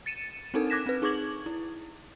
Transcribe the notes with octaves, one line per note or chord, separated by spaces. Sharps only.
A6 C#7 D#7 E7
C4 D4 D#4 A4 A#4
D6 F#6 G#6 A#6 B6 E7
C4 B4
D#4 G#4 C#6 D6 G#6 F#7
E4